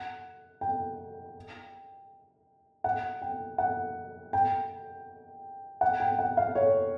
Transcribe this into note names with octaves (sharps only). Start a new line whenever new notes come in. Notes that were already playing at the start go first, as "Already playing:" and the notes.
Already playing: F#5
G5
F#5
G5
F#5
G5
F#5
G5
F#5
F5
C#5